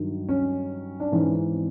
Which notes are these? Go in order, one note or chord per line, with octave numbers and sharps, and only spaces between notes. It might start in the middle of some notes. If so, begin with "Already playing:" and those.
Already playing: G2 D#3 F#3
C#4
D4
G#2 E3 C#4
C4